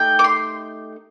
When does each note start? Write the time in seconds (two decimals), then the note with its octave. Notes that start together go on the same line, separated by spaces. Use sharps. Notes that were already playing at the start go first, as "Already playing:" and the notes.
Already playing: A3 D#4 G4 G5
0.19 D6
0.24 C6